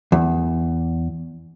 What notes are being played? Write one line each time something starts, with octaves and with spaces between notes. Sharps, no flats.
E2